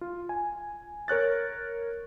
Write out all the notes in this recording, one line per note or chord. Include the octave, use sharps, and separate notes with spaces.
F4
G#5
A#4 C#5 F#6 A6